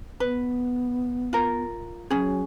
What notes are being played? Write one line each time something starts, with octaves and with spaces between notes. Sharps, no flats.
B3 B4
F4 A#4
F#3 C#4 G#4